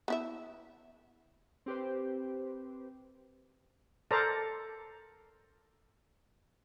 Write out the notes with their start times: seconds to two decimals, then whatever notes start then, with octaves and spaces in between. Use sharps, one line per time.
0.08 B3 E4 E5
1.66 C4 G4 B4 C5
4.11 A4 A#4 C5 D5 A5 A#5